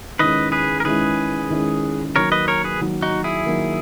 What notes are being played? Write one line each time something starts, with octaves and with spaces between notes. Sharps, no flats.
D#3 G#3 C#4 E4 B4 D#5
G#4 B4
A#4
D#3 G#3 C#4 E4 G#4 B4
D#3 G#3 C#4 E4
D#3 F#3 A#3 A#4 C#5
B4 D#5
A#4 C#5
G#4 B4
D#3 F#3 A#3
D#4 F#4
E4 G#4
D#3 F#3 A#3